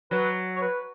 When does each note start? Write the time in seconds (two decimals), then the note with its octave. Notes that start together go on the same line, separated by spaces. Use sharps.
0.11 F#3 B4
0.56 C#5
0.61 B4